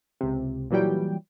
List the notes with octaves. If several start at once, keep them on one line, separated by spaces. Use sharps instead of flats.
C#2 C3
A#2 E3 F#3 G3 G5